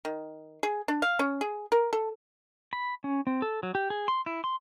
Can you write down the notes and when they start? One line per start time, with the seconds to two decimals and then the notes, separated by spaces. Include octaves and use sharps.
0.05 D#3
0.63 G#4
0.88 D4
1.02 F5
1.19 C#4
1.41 G#4
1.72 A#4
1.93 A4
2.73 B5
3.04 C#4
3.27 C4
3.42 A4
3.63 F#3
3.75 G4
3.90 G#4
4.08 C6
4.26 E4
4.44 C6